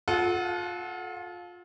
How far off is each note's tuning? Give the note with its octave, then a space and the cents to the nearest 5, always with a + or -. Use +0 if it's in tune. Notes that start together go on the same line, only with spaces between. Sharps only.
F4 +25 A4 -25 F#5 +0